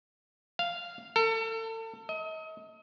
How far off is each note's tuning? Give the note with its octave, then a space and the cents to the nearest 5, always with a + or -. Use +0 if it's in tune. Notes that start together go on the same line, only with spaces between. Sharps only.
F5 -5
A4 +35
D#5 +35